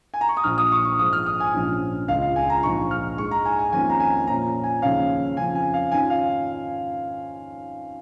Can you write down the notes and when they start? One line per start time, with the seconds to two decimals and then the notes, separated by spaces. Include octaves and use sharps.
0.14 G#5
0.21 A#5
0.29 C#6
0.37 D#6
0.44 A#1 A#2 F3 F6
0.58 D#6
0.72 C#6
0.85 C#6
0.99 G#1 G#2 F3 G#3 D#6
1.13 F6
1.26 D#6
1.40 G#5
1.54 A#1 G#2 F3 C#4
2.08 C#2 C#3 G#3 F4 F5
2.22 F5
2.36 G#5
2.50 A#5
2.63 A#1 G#2 F3 C#6
2.91 F6
3.18 G#2 G#3 D#4 C#6
3.31 A#5
3.45 G#5
3.59 G#5
3.73 F2 D#3 A#3 C#4 F4 G#5
3.90 A#5
4.00 G#5
4.27 A#2 F3 C#4 F4 A#5
4.64 G#5
4.82 D#2 C#3 F3 C#4 F5
5.37 F2 C#3 F3 C#4 G#5
5.55 G#5
5.74 F5
5.92 G#2 D#3 C#4 F4 G#5
6.10 F5